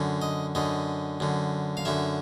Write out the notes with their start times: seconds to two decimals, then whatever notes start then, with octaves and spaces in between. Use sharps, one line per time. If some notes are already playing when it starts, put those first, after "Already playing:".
Already playing: F#2 D3
0.22 D#5
0.55 F#2 D3 D#5
1.20 F#2 D3
1.77 F5
1.85 F#2 D3 E5